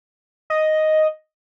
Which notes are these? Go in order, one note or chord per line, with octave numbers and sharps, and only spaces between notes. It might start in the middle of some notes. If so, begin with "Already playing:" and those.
D#5